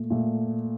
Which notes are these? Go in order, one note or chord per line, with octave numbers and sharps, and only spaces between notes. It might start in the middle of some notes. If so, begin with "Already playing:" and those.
Already playing: A#2 A3
A#2 A3